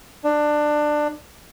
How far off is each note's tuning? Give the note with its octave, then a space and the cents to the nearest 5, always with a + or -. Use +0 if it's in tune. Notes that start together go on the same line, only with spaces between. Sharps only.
D4 +20